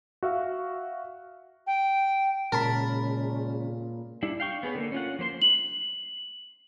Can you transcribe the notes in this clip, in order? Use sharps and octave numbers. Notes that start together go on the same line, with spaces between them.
F#4 E5 F5
G5
A#2 C#3 G#3 C#4 A#4 A5 B5
G3 D4 E4
F5 G5 C#6
B3 G#4 B4 C#5
D3 A#3
C#4 F4 F#5
F3 A#3 C5 C6
F#7